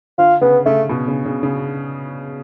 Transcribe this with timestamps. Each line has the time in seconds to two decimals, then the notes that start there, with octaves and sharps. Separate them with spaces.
0.18 D3 F4
0.41 C#3 B3
0.66 C#3 A3
0.89 B2
1.08 C#3
1.25 C#3
1.43 C#3